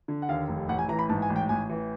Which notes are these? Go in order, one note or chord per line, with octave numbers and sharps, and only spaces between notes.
D3
F#5
D#2 F5
F1
A1 F#5
G#5
E3 A#5
B5
G#2 A5
G#5
A1
G5
A1 G#5
E3